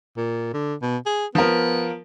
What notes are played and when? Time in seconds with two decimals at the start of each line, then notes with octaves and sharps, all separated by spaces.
0.17 A#2
0.54 D3
0.82 B2
1.06 G#4
1.35 F3 B3 A#4